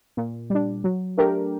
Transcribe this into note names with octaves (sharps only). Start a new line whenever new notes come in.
A#2
G3 D4
F#3
A3 D4 G4 A#4